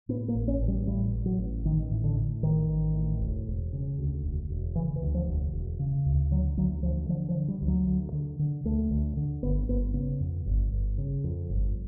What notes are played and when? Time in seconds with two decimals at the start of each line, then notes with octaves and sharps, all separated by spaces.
0.09 A2 B3
0.28 A#3
0.35 A1
0.48 C#4
0.61 A1
0.68 G3
0.87 A2 G3
1.13 A2
1.26 F#3
1.39 A1
1.65 A1 D#3
1.91 A2
2.04 D3
2.17 A2
2.43 A1 D#3
2.69 A1
2.94 A2
3.20 E1
3.47 E1
3.73 C#3
3.99 D2
4.24 E1
4.50 E1
4.75 C#3 E3
4.96 E3
5.02 D2
5.14 F3
5.27 E1
5.53 E1
5.80 C#3
6.06 D2
6.31 D3 F#3
6.57 D2 F#3
6.83 D2 F3
7.09 D3 F3
7.29 F3
7.35 D3
7.48 G3
7.62 D2
7.68 F#3
7.87 D2
8.12 D3
8.39 D3
8.64 D2 A3
8.91 D2
9.17 D3
9.43 G1 B3
9.69 G1 B3
9.94 C#3 B3
10.20 F2
10.46 G1
10.72 G1
10.98 C#3
11.24 F2
11.50 G1